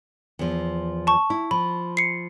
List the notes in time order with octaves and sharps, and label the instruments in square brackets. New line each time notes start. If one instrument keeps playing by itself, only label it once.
[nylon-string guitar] E2 F3
[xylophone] A5 C#6
[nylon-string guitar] E4
[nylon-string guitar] F3 [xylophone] B5
[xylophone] C7 C#7